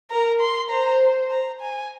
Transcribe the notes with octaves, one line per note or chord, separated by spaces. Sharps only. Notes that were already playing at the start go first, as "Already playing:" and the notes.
A#4 A#5
C6
C5 A#5
A#5
G#5